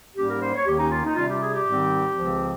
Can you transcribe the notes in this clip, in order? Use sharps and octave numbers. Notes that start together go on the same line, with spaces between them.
G#2 G3 A#3 C#4 G4
A#4
C5
C#5
D#2 D#3 A#3 C#4 G4
D#4
F4
D#4
C3 G3 C#4 F4
G4
G#4
G4
G#2 D#3 G3 C4
C#2 C#3 F3 C4